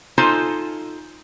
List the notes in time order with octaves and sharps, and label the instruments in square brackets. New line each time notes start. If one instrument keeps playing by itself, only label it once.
[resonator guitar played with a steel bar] D#4 F4 A4 C5 G#5